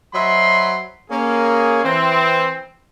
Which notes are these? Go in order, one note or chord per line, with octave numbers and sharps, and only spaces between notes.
F#3 C5 D#5 E5 B5 C6
A#3 C#4 G#4
E3 C4